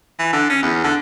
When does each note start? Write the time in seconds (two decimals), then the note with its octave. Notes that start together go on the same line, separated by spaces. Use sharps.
0.19 E3
0.33 D3
0.49 C#4
0.62 E2
0.84 D3